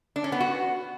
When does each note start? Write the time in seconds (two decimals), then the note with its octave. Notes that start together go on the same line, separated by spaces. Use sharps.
0.16 D4
0.24 C#4
0.32 B3
0.40 F#4